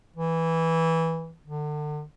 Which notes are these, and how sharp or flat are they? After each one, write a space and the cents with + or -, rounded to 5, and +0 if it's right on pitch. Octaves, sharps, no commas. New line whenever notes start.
E3 -10
D3 +35